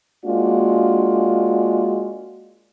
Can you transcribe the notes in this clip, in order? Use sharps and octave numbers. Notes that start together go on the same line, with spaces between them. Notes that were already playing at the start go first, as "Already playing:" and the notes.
G#3 A#3 D4 F4 F#4